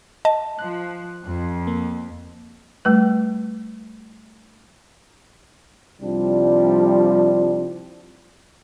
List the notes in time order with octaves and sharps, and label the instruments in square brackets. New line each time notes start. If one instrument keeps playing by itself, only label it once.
[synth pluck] D#5 A5
[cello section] F3 [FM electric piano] F#6
[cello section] F2
[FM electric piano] A#3
[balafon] G3 A3 B4
[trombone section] C2 F3 G3 D4